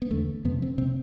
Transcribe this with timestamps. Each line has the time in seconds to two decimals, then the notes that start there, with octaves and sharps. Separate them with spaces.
0.02 B3
0.11 E2 D3 A3
0.45 F2 C3 B3
0.62 C4
0.78 C3 C4